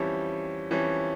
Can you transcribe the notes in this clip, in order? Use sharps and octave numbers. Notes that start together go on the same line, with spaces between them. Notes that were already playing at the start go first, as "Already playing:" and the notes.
Already playing: F2 E3 G3 C#4
F2 E3 G3 C#4